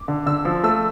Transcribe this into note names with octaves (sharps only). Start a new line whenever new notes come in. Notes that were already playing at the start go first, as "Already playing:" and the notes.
Already playing: D6
D3
D3 E6
F3
A3 E6